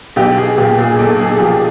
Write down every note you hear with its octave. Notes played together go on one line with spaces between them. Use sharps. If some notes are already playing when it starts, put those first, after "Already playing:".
B1 G4
B1 G#4
A#2 G4
A#2 G#4
B1 A4
B1 G#4
F3 G4